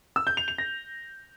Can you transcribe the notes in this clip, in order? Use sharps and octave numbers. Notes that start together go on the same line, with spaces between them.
E6
G6
F7
F7
A#6